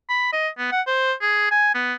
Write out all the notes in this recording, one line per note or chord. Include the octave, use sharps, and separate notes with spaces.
B5
D#5
B3
F#5
C5
G#4
G#5
B3